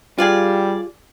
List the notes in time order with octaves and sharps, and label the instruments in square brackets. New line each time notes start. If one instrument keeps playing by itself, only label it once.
[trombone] G3 [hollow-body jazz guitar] F4 G4 [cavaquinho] G#4 D5 F5